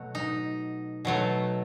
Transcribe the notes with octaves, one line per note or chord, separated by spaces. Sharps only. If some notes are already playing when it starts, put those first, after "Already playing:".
Already playing: B2 F#3 A3 F#4
D#4
B2 F#3 A3